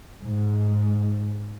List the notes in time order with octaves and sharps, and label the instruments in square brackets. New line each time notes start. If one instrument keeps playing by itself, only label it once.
[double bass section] G#2